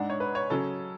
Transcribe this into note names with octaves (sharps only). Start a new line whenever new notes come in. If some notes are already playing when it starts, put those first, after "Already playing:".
Already playing: G#2 G#3 D4 F#5
C#5
B4
C#5
C#3 F#3 C#4 A4